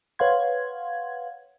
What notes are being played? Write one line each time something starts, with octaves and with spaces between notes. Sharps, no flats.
B4 C#5 F5 F#5 C6 G#6